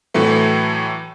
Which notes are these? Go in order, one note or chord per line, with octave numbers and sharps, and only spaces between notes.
A2 E3 F#3 A3